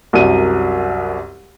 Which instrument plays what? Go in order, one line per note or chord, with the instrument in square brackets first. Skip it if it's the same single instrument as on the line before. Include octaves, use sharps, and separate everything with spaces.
[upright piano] C2 F#2 D#7